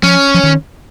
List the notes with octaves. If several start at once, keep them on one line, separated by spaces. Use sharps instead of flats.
F3 C#4
F3
D#3